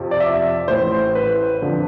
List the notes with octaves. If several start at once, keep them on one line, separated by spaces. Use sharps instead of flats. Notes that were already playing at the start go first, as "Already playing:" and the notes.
Already playing: F2 C3 F3
D5
E5
A1 A2 E3 C5
B4
F2 D3 F3